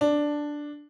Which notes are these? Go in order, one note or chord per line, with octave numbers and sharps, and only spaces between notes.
D4